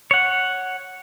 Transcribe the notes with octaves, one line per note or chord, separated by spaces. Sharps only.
C#5 F#5